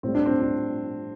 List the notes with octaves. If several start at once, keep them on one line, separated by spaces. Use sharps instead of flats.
A2 G3 C4
D4
C4
D4